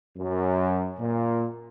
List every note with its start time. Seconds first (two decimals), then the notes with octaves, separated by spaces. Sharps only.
0.17 F#2
0.99 A#2